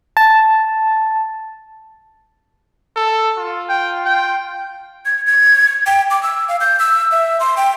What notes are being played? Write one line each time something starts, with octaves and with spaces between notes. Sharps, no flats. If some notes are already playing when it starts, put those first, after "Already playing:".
A5
A4
F4
G5
G5
G#6
G#6
G5
D6
E6
F5
G6
E6
E5
C6
G5